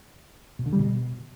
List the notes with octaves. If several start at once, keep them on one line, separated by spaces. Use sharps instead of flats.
B2
D3
G3
B2